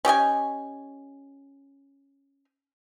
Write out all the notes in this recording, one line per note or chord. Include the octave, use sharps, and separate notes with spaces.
C#4 G4 D#5 G#5